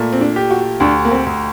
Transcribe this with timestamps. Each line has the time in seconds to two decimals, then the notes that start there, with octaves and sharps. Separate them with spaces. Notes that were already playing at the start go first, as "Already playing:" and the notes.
Already playing: A#2 A3
0.12 C4
0.21 D4
0.36 G4
0.50 F#4
0.80 D2 D4
1.05 A#3
1.11 C4
1.26 D2